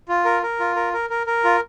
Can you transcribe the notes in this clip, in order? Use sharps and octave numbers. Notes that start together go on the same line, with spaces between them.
F4
A#4
A#4
F4
A#4
A#4
A#4
A#4
F4